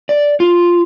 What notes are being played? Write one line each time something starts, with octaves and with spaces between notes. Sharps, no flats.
D5
F4